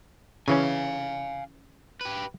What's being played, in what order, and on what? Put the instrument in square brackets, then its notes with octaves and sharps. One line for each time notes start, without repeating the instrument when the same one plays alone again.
[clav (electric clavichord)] C#3 E3 C#4 [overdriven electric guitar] F5 G#5
[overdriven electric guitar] G4 B4